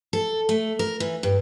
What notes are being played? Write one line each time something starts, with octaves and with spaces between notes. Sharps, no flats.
A4
A3
A#4
E3
G2